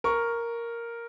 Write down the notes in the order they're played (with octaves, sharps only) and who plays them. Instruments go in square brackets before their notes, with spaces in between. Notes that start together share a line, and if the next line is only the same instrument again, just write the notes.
[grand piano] A#4 C#6